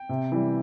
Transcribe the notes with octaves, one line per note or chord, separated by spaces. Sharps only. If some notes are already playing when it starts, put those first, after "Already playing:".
Already playing: G5
C3
E3 G3